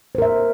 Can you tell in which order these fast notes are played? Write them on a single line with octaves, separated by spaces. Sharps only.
C5 A#4 E5